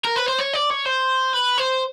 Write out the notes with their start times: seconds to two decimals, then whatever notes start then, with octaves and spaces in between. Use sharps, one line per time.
0.04 A#4
0.16 B4
0.26 C5
0.39 C#5
0.53 D5
0.70 C#5
0.85 C5
1.33 B4
1.58 C5